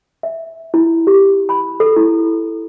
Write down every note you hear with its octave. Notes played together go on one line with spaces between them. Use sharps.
E5
E4
G4
B5
A4
E4